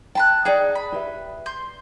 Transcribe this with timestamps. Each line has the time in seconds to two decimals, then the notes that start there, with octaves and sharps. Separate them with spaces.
0.15 G5 A5 B5 F#6
0.45 D#4 G#4 D5 G5
0.75 B5
0.92 G4 B4 E5
1.46 C6 G6